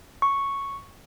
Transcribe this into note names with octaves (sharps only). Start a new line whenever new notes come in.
C#6